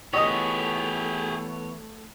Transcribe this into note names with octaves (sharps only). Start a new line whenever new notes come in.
E3 A3 B3 G4 G#4 C#5 D#5 D#6